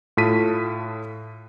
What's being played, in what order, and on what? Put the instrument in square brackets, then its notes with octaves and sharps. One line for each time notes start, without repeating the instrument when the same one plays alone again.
[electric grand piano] A2 F4 A4 A5 B6 D#7